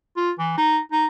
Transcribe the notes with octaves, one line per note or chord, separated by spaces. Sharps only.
F4
E3
D#4
D#4